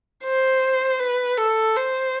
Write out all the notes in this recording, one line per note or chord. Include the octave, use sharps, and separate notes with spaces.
C5
B4
A4
C5